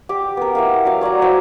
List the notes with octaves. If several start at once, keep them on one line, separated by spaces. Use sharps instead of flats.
G4 D6
B3 A#4
E4 A#4 F5
F#3 F5
C#5 D5 F5 A#5
E4 F#4 C5 E5